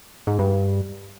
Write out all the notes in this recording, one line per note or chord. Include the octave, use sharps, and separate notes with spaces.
G#2
G2